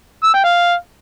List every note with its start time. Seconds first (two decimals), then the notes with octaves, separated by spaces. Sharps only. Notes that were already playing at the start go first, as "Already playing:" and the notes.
0.24 E6
0.34 G5
0.44 F5